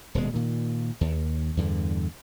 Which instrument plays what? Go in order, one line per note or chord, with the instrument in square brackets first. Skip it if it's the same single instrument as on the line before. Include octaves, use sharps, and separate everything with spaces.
[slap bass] D#1 B2 G#3
A#2 D#3
D#2
E2 G2 D3